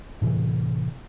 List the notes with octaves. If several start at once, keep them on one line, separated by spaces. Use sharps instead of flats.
A2 C3 E3